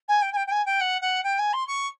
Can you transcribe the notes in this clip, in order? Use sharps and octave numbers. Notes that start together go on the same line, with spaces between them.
G#5
G5
G#5
G5
G5
G#5
G5
F#5
F#5
G5
G#5
C6
C#6